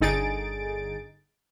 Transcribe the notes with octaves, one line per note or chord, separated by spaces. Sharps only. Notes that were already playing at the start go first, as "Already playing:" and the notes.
G1 D3 D#4 G#4 A6 D7